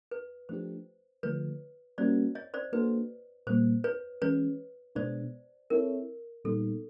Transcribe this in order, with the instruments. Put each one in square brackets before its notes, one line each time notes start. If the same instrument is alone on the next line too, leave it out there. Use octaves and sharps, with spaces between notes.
[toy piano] B4
[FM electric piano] F3 A3 D4 G4 [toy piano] C5
[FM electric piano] D3 F3 A3 [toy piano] B4 C#5
[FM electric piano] G3 A#3 C#4 F#4 A#4 [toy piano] C5 D5
[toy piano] C#5 D#5
C5 D5
[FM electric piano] A#3 D4 F#4 A4 C5 [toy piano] B4
[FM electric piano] A#2 G3 A#3 [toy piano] C5
[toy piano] B4 C#5
[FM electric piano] E3 G#3 C#4 [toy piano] B4 C#5
[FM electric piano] B2 G#3 B3 D4 [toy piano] C5 D5
[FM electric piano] C4 E4 A4 C#5 E5 [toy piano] A#4
[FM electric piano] A#2 G3 B3 D#4 [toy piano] A4